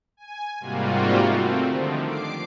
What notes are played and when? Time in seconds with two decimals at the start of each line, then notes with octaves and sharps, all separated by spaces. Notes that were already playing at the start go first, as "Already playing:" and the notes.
0.17 G#5
0.60 G#2 C3 G3 A#3 F4 F#4
1.23 A3 C4
1.64 D3 D#3 F3
2.05 D6 C7 D7